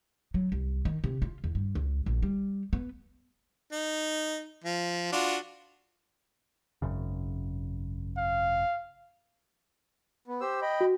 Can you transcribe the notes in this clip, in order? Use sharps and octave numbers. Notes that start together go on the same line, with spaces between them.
F#3
C2
D#3
C3
F4
E2
G2
C#2
A#1
G3
B3
D#4
F3
D4 F4 F#4
G#1 F#2 C#3
F5
B3
G4 C5 E6
D#5 G5 B5
F#4